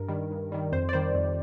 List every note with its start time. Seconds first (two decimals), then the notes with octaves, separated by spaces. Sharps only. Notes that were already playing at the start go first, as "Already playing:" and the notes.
Already playing: G2 A#4
0.09 D#3 G3
0.31 G2
0.52 D#3 G3
0.72 F2 C5
0.89 D5
0.93 D#3 G3 C5
1.15 F2